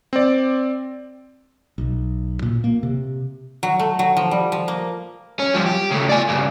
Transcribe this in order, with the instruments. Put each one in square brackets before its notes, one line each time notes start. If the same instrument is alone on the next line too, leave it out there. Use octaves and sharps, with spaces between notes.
[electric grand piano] C4 D5
[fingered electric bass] B1
A#2
A#3
C3
[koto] F#3
A3
F#3
F3
G3
F3
A#3
[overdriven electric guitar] C#4
G2 F3
G4
C#3 A3
D5 G#5
G2 C#3